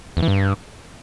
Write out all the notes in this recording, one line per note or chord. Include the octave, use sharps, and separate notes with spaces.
E2
E3
G2